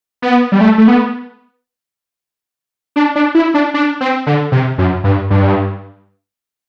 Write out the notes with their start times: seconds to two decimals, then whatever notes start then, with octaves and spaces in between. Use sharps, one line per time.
0.22 B3
0.52 G3
0.61 A3
0.78 A3
0.88 B3
2.96 D4
3.16 D4
3.35 E4
3.54 D4
3.74 D4
4.01 C4
4.27 D3
4.52 C3
4.78 F#2
5.04 G2
5.30 G2